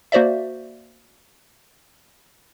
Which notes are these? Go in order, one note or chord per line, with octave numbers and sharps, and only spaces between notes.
A#3 F#4 C5 D5 E5